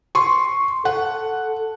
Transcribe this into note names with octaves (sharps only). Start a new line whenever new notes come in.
C6 C#6
A4 F#5